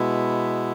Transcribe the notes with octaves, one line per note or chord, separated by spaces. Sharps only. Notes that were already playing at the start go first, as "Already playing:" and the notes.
Already playing: B2 G#3 B3 E4